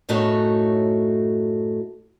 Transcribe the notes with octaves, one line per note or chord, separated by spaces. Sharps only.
F#2 A2 A3 D#4 F#4 C#5